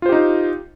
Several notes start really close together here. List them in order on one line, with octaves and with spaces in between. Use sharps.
F4 C5 G4 D#4